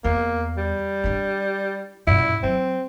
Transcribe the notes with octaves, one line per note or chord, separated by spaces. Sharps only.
E2 A#3
G3
D4 E4
F#2 A#2 E4
F#3 C4